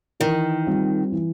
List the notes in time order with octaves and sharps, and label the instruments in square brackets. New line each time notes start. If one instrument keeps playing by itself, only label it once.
[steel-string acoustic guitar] D#3 [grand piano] E3
[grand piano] G3 C4 F4
E3